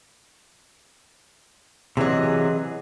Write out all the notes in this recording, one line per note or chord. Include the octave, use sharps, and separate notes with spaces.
C3 E3 F#3 G#4 D#5